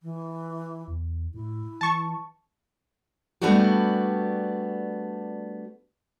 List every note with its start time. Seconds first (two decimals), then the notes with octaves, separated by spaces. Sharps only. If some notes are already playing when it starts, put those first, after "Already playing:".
0.03 E3
0.88 E2
1.34 A2 E4
1.81 E3 A5 C#6
3.42 G3 A3 B3 D4 F#4 G4